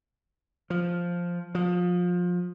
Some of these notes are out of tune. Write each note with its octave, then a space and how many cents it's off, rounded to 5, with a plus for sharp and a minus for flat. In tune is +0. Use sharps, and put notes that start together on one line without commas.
F3 +0
F3 +25